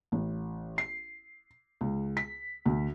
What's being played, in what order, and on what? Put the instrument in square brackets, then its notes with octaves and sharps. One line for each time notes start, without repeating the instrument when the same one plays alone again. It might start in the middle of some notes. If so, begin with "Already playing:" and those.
[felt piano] A1
C7
C#2
B6
D2